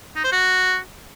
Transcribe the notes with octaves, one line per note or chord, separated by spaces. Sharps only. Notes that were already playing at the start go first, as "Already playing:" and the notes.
D#4
C5
F#4